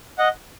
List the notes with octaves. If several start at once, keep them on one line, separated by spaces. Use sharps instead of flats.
D#5 F#5